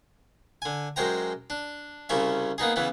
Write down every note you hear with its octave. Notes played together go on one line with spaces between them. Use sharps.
D3 G#5
F#2 G#3 C5 G5 A#5
D4
C2 C#3 C#4 E5
A#3 B3 D#4 G#4
C#3 E3 B3